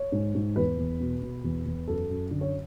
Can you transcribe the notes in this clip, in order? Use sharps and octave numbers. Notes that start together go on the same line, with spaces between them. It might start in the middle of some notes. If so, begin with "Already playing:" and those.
Already playing: C#5
G#2
G#2
E2 B4
E2
B2
B2
E2
E2
F#2 A4
F#2
D3
C#5